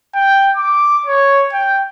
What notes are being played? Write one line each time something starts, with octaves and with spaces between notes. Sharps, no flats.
G5
D6
C#5
G5